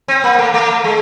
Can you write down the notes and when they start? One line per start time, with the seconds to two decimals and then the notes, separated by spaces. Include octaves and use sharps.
0.08 C4
0.24 A#3
0.39 A3
0.54 A3
0.84 G#3